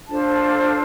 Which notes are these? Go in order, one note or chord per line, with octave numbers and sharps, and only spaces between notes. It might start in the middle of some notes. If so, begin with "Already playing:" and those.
D4 F4 A4 C5 A5